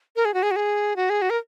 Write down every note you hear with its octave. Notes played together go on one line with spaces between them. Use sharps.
A#4
G#4
F#4
G#4
F#4
G#4
F#4
G#4
F#4
A#4